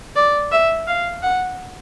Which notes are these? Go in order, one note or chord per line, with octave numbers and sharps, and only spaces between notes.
D5
E5
F5
F#5